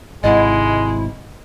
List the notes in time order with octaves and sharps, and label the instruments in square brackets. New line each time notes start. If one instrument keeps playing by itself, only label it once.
[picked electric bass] G#1 G#2 C3 [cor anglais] G#3 [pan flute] E4 [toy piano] D#5 F#5